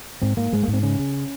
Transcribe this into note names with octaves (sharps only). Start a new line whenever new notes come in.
G#2 C4
G#2 A#3
G#2 G#3
G#2 A#3
C4
C#3 C#4
C#3